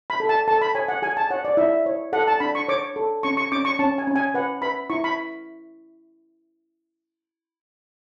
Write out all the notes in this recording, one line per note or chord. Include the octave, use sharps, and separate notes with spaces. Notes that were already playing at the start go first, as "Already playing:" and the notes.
B5
A4
A5
A4 A5
B5
C#5 G#5
F#5
G#4 G#5
A5
C#5 F#5
D5
E4 E5
C#5
A4 F#5
A5
D4 B5
C#6
C#5 D6
A4
C#4 C#6
C#6
C#4 D6
C#6
C#4 A5
G#5
C#4
G#5
B4 F#5
B4 B5
E4 C#6
B5